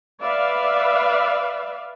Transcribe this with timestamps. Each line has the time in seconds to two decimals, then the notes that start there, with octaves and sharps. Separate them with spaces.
0.23 B4 D5 E5 F5